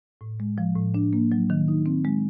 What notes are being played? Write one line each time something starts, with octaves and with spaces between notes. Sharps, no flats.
A2
G#3
F3
A2
D4
A#3
F#3
D#3
D#4
C4
G#3